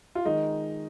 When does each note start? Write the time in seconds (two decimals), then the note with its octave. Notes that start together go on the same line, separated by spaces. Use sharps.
0.15 F4
0.25 D#3 G#3 D#4